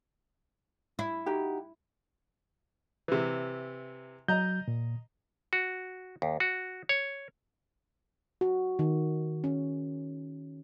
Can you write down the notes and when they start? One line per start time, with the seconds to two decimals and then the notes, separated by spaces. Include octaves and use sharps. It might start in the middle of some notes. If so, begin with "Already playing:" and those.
0.99 E4
1.26 D#4 F#4 G4
3.08 C3 E3
4.28 F#3 D#5 A#5 G6
4.68 A#2
5.53 F#4
6.22 D#2
6.40 F#4
6.89 C#5
8.41 F#4
8.79 D#3
9.44 C#4